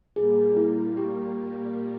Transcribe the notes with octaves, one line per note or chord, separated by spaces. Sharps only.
A#2 G3 A#3 G#4
E4
G4